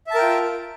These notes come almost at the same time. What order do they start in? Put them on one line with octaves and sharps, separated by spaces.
E5 A5 A#4 G5 F4